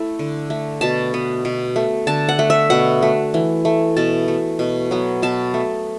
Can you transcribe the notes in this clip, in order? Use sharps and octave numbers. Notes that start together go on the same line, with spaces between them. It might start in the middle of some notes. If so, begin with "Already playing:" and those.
Already playing: A3 E4 A4
D3
A3
B2 A5
B3
B2
A3
D3 A5
F#5
A3
E5
B2 F#5
A3
E3
A3
B2 A5
A3
B2
F#3 B3
B2 A5
A3